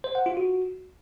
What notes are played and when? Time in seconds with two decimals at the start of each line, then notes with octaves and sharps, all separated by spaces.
0.04 C5
0.15 F#5
0.26 F4
0.37 F#4